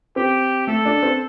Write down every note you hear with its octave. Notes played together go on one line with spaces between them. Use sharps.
C4 G4
A3 A4
D4
C4